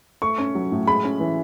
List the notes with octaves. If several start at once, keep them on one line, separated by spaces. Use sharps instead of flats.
A3 C#6
C#4
F#3
A2
G#3 B5
C#4
E3